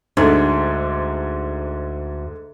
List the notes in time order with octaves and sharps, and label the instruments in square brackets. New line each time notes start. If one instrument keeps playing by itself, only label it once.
[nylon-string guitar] D2 [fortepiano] G#2 D3